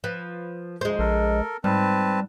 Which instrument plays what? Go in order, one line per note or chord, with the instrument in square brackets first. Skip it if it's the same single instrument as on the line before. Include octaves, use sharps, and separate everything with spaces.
[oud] F3 B4
[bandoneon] D2 [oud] G#3 C5
[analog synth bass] A#1 [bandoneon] A4 A#4
[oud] G#2 [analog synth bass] G3 [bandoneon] C4 B4 A5